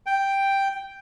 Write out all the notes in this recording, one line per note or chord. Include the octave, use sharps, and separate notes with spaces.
G5